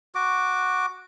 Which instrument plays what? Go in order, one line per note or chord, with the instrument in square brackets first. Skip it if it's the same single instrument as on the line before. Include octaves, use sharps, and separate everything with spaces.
[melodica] F#4 D6